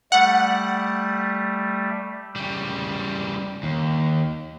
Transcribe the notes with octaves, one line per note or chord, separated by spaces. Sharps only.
G3 A3 F#5
C#3 G3
D#2